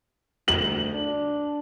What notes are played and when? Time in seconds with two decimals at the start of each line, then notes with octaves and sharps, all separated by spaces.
0.48 D2 F#7
0.94 D4